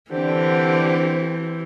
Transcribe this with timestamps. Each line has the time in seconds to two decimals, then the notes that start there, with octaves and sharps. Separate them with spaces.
0.11 D3 E3 C4 G4 C5